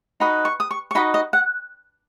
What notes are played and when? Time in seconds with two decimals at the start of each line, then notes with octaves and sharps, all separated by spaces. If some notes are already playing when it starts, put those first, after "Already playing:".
0.20 D#4 F#4 B4 D#5 B5
0.45 C#6
0.60 D#6
0.71 C#6
0.91 C#6
0.95 D#4 F#4 B4 D#5 B5
1.14 D#5
1.33 F#5